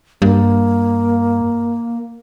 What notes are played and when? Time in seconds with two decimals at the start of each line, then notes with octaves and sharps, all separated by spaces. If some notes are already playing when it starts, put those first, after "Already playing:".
0.22 G2 A#3